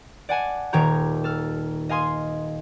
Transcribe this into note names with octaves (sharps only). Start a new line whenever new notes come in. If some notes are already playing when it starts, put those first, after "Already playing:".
D5 F#5 G#5 A5
D#1 D#3 G4 C#5 A#5 G6
A4 F6
D#5 F5 G#5 C6 D#6